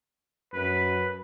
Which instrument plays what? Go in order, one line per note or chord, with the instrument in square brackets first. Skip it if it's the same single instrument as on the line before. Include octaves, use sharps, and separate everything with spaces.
[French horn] F#2 [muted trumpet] B4